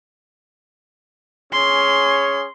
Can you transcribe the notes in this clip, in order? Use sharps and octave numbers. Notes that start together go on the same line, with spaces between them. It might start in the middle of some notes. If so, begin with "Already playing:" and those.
C#4 G#4 C#5 C6